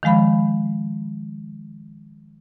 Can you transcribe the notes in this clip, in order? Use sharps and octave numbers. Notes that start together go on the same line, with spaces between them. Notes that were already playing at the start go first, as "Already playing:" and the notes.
D#3 F3 G#3 F5 B5